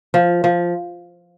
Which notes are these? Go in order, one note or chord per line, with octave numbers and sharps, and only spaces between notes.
F3
F3